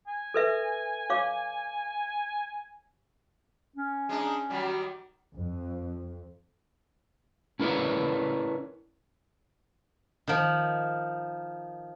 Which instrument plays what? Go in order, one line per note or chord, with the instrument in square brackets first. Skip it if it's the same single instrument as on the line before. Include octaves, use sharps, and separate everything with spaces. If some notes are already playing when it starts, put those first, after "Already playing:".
[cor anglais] G#5
[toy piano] A4 B4 E5
C#5 F5 D6
[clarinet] C#4
[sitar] G#3 D4 D#4
D#3 F#3 G3
[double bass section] F2
[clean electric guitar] C#4 E4 A#4 B4 C#5 D5
[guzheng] D#3 F3